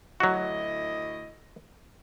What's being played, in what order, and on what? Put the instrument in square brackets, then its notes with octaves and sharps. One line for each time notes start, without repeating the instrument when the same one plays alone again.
[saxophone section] D2 E4 D#5 [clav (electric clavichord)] F#3 F#4